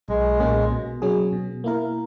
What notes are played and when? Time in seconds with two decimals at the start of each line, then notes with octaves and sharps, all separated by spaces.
0.09 B1 G#3
0.40 A#2 A#3 C#4 G#4
0.71 B2
1.02 F#3 C#4 G#4
1.33 B2
1.64 A#3 E4 A#4